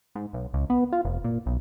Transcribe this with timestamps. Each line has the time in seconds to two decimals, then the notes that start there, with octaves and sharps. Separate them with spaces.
0.15 G#2
0.33 B1
0.53 C#2
0.70 B3
0.93 F4
1.05 F1
1.24 A#2
1.46 B1